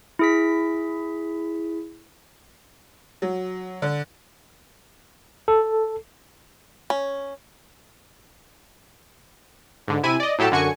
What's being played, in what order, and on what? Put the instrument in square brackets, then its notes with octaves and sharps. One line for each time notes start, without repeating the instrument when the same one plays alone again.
[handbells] E4 G#4 B6
[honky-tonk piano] F#3
D3
[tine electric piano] A4
[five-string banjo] C#4
[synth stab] G#2 D3
C3 E4 G#5 D#7
D5 D#5
A2 F#3 G4 A4 A5
F#2 D3 F#4 G#5 C#6 C#7